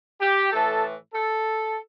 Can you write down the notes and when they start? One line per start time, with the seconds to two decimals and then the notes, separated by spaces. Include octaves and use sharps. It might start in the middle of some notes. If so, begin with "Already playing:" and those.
0.21 G4
0.52 A2 E3 A4
1.14 A4